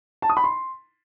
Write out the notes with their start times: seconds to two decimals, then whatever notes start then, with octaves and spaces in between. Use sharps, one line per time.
0.22 A5
0.30 D#6
0.37 B5
0.44 C6